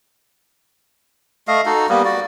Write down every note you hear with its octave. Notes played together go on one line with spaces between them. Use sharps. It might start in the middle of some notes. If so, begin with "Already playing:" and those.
A3 D#5 F5
D#4 F#4 A4
G3 A#3 B3
F#4 D5